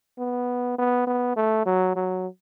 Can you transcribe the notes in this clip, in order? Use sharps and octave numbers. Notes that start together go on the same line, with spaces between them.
B3
B3
B3
A3
F#3
F#3